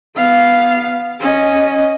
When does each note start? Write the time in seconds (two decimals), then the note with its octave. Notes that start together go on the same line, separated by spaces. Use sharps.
0.16 B3 F5
1.20 C#4 D#5